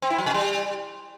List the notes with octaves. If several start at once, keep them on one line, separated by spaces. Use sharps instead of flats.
C4
E4
F#3
C3
G3